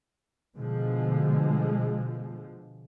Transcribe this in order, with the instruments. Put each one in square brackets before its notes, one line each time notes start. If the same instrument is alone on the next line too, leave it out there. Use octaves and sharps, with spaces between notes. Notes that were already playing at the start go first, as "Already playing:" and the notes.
[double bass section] B2 D3 F3 G#3